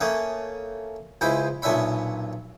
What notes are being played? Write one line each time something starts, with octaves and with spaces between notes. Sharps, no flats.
A3 A#3 C#4 D#6
C#2 G#3 E4 C5 B5
B1 A#2 C#4 D4 E5 B5